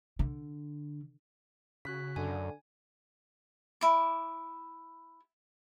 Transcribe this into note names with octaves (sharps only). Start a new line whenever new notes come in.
D3
C#3 F#4 F#6 B6
F#2 D3 G#5
E4 D6